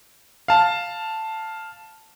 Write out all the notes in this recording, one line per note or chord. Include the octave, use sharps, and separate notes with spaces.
F5 A5